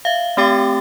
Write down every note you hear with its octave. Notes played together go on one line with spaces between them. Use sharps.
E5 F5
A3 C4 G4 G5 D6 A6